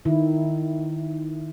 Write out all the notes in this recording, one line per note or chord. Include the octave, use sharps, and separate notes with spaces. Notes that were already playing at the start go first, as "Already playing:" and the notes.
D#3 E4